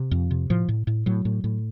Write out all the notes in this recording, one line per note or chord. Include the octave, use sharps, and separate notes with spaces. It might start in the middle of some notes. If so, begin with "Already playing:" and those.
Already playing: C3
F2
C3
A2 F3
A2
A2
A2 F#3
A2
A2